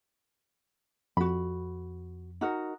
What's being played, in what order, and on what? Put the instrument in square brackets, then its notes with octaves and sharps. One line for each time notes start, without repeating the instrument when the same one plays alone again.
[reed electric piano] F2 [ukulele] F#4 B5
[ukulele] D#4 F#4 A#4